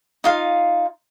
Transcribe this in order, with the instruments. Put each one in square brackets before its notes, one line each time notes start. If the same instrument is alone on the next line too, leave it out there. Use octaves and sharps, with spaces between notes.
[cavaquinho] D#4 F4 F5